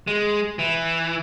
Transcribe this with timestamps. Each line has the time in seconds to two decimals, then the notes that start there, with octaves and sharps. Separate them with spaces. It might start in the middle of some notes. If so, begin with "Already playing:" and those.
0.07 G#3
0.59 E3